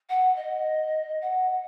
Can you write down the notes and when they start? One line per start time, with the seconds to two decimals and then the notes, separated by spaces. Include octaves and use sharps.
0.09 F#5
0.36 D#5
1.21 F#5